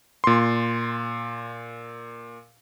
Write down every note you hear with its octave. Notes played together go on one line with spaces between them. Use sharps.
A#2 C6